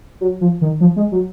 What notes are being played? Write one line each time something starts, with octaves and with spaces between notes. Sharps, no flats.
F#3
F3
D#3
F3
G#3
F#3